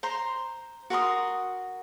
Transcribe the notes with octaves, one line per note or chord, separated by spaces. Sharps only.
C5 A#5 C6
F#4 A#4 C6 D#6